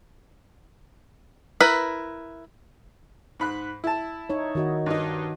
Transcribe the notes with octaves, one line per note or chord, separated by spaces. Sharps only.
E4 A#4 B4
G#2 B5 F#6
E4 A5
D#4 C#5
D#3 F#4 D#5
G2 D#4